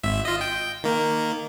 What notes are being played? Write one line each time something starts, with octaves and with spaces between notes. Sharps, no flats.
G#1 E5
F4 D#5
G5
D#3 A#3